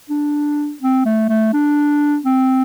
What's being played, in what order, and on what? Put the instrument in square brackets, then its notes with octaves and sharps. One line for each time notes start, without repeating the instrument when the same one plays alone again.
[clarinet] D4
C4
A3
A3
D4
C4